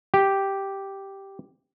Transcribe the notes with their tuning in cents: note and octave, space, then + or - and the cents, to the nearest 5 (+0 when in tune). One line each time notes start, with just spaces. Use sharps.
G4 -5